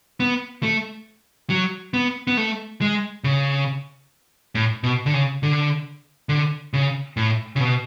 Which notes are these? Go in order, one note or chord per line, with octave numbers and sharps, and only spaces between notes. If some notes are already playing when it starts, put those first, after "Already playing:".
B3
A3
F#3
B3
B3
A3
G#3
C#3
A2
B2
D3
C#3
D3
D3
C#3
A2
C#3
B2